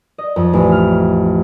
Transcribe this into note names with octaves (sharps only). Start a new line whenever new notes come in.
D#5
F2
A1
F6